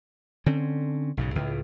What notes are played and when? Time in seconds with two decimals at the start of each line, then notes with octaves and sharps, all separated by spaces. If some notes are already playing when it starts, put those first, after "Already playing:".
0.46 D3 C4 C#4
1.17 B1 G#2 C#3
1.35 C#2 A2